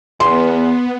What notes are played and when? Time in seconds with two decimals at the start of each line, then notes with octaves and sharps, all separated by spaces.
0.20 E2 B3 C6